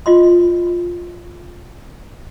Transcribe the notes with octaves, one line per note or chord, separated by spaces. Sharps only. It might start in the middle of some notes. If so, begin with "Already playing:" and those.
F4 D#5 C6